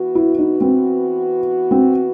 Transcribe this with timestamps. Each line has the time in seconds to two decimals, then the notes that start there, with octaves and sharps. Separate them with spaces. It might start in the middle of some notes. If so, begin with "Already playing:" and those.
Already playing: E3 B3 F#4
0.15 E4
0.39 D#4
0.61 C4
1.71 C4